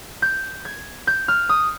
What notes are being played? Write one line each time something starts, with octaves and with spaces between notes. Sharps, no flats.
G6
G#6
G6
F6
D#6